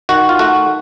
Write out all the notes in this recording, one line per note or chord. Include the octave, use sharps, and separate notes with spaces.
D#3 F#4
F4
A3 F#4